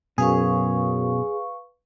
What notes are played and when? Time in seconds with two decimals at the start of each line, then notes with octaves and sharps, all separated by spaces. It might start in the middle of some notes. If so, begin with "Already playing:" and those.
0.18 F#2 B2 G#4 B4 F5 C#6